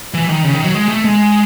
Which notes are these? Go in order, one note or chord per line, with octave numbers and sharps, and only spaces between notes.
E3
D#3
C#3
D#3
F#3
G#3
A3
G#3